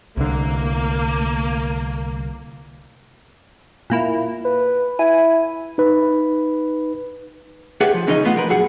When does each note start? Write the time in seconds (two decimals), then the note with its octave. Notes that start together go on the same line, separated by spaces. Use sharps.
0.17 C2 D3 A#3
3.90 A#2 A#3 E4
4.45 B4
4.99 E4 G#5
5.78 D#4 B4
7.81 G4 G#4 B4 C#5 E5 F#5
7.94 F3
8.07 C#2 E3 C#4 D#4 G#4 D#5
8.24 A3 B3 F4 B4 F#5
8.36 F3 A#4 B4
8.49 F#2 A#2 G#4 F#5